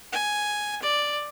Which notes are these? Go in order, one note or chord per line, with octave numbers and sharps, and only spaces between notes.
G#5
D5